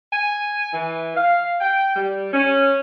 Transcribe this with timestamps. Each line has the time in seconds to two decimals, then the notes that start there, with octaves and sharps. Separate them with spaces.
0.13 G#5
0.73 E3
1.16 F5
1.61 G5
1.96 G3
2.33 C#4